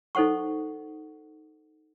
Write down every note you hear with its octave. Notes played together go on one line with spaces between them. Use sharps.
D#4 A4 C5 F#5 C#6